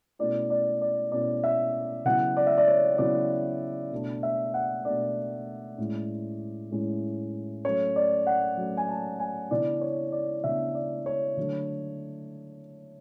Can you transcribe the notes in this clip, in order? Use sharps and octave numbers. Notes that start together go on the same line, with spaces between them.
B2 A3 C#4 E4 D5
D5
D5
B2 A3 C#4 E4 D5
E5
C#3 F#3 B3 E4 F#5
D5
E5
D5
C#5
C#3 F#3 B3 E4 D5
B2 A3 D4
E5
F#5
B2 A3 D4 D5
A2 G#3 C#4 E4
A2 G#3 C#4 E4
F#3 A3 C#4 C#5
D5
F#5
F#3 A3 C#4
G#5
A5
G#5
C#3 E3 B3 D4 D5
C#5
D5
C#3 E3 B3 D4 E5
D5
C#5
D3 F#3 A3 D4